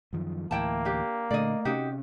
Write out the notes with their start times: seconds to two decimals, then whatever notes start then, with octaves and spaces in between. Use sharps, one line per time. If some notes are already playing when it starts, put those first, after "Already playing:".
0.13 F#2 D#3 F3
0.51 D2 A2 E3 A#3 E4 G5 A5
0.85 D4 G4
1.31 A#2 D3 A3 D5 D#5
1.65 C3 C#4 D#4 F#4 G4